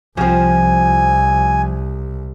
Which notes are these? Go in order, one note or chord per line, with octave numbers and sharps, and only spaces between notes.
C2 F3 C4 G#5